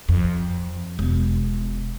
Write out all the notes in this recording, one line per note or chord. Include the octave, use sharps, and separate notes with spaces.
F2
E1